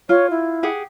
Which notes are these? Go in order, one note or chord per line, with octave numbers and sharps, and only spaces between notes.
F4 C#5
E4
G4 G#4 F#5